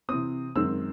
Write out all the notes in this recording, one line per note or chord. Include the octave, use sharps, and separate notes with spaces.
C3 E3 C4 D#6
F#2 D#3 G#3 C4 E6